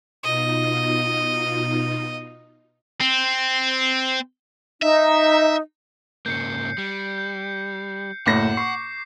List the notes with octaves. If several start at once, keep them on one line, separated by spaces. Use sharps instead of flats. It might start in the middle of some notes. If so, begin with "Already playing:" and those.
B2 D#4 F4 D#5
C4
D#4 E5
G#2 C#3 A#3 G6 C7 C#7
G3
G6
F#1 A2 F#5 D6 A#6
C#6 C7